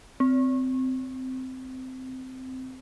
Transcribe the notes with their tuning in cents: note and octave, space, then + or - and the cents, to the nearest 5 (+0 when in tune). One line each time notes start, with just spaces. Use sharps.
C4 -15